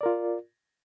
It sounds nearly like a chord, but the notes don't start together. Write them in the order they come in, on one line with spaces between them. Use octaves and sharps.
D5 A#4 F4